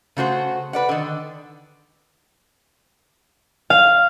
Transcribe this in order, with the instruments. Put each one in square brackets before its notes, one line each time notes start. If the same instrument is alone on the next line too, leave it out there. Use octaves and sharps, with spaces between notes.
[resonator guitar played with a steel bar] C#3 A3 F#4 C5
B4 D5 F#5
D3 D#3
[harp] F5